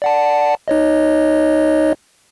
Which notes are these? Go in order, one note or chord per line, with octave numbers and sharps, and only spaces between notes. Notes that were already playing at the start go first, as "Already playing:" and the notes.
D5 F#5 A5
D#4 C#5 D#5